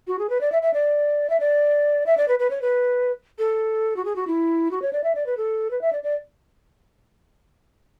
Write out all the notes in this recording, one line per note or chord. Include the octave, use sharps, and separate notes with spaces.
F#4
G#4
B4
D5
E5
E5
D5
E5
D5
E5
D5
B4
B4
C#5
B4
A4
F#4
G#4
F#4
E4
F#4
C#5
D5
E5
D5
B4
A4
B4
E5
D5
D5